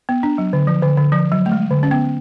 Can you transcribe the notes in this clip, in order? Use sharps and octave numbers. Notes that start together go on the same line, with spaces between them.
B3
D4
F#3
D3
F3
D3
D3
F3
F#3
A3
G#3
D3
C#4
B3